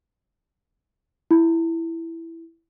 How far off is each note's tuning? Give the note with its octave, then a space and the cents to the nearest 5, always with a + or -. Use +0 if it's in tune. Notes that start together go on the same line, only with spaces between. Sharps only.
E4 +5